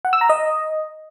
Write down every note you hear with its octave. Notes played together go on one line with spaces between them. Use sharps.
F#5
E6
A#5
D#5